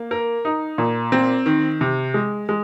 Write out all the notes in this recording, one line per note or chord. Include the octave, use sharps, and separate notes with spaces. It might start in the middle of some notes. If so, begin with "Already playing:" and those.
Already playing: A#3
A#4
D#4
A#2
C4
D#3
C3
G#3
G#3